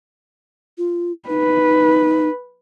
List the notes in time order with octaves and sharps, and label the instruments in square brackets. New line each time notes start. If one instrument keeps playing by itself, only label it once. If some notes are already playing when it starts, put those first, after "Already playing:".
[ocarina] F4
[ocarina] D#4 [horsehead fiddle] B4